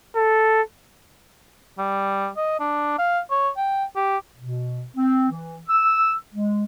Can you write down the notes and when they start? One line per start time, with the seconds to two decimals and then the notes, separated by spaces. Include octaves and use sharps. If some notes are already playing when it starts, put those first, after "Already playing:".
0.16 A4
1.78 G3
2.37 D#5
2.60 D4
2.99 F5
3.31 C#5
3.57 G5
3.96 G4
4.37 B2
4.97 C4
5.30 E3
5.68 E6
6.33 G#3